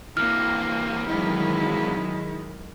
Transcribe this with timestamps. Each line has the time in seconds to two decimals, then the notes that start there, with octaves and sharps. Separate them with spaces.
0.17 C3 E3 A#3 F6
1.07 D#3 F#3 G#3 E4